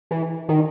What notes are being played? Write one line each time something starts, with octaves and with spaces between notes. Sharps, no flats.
E3
D#3